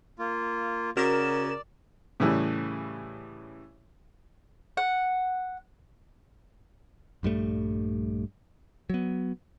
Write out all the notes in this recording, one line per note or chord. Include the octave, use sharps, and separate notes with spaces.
A#3 F4
C#3 F#4 A#4 D5 E7
A2 C#3 E3 G3
F#5
A#1 G2 G3 A3
F#3 B3